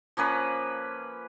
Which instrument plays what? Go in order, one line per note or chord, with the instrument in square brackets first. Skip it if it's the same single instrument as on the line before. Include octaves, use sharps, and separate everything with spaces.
[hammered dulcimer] F3 A#3 C#4 B4